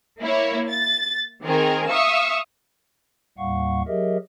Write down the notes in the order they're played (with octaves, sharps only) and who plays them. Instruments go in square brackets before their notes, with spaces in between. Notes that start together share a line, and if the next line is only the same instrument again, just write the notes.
[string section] A#3 E4 C#5
A6
D#3 C4 G#4 A#4
E5 F5 C#6 D#6 E6
[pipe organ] D#2 A2 G3 F5 F#5 C#6
F#3 G4 G#4 A#4 D#5 E5